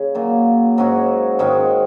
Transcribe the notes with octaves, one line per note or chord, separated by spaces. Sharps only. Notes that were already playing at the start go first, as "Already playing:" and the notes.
Already playing: C#3 C#4
A#2 F#3 A#3 F4
G#2 F#3 C#4 F#4
G#2 D#3 G#3 C#4